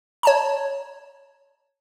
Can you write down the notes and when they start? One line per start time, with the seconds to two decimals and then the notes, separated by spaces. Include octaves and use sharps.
0.23 C#5 A5 A#5